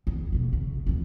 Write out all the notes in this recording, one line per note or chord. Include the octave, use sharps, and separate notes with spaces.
E2
B1 C#3
C#3
D2 E3